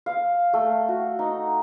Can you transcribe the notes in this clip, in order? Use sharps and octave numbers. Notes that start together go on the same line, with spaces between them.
F5
A3
F#4
D#4